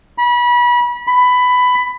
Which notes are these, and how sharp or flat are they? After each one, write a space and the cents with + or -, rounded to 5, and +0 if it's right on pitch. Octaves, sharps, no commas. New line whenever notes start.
B5 -30
B5 +15